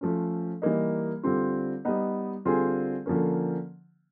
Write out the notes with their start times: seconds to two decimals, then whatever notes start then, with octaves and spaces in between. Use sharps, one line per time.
0.01 F3 A3 C#4
0.62 E3 G3 A#3 D#4
1.23 D3 G3 C4 F4
1.85 G3 B3 D#4
2.45 D3 G3 C4 F4 G#4
3.06 D3 F3 A#3 C#4